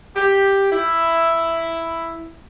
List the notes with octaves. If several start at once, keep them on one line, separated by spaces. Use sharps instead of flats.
G4
E4